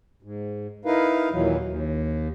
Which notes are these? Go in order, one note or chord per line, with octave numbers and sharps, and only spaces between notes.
G#2
D#4 E4 A#4 B4 F5
D#2 A#2 E3 F#3
D#2